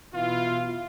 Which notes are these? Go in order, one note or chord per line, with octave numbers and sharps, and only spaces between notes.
B2 E3 E4 F4